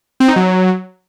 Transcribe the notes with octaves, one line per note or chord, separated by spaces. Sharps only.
C4
D#4
F#3